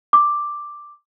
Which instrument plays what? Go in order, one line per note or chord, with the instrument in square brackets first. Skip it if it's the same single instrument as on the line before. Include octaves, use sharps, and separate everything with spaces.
[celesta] D6